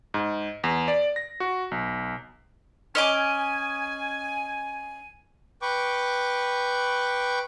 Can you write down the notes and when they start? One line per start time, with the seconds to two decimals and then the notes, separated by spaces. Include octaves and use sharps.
0.14 G#2
0.64 E2
0.88 D5
1.16 A#6
1.40 F#4
1.71 B1
2.95 C#4 D#5 G#5 D6
5.62 B4 G5 C#6 D6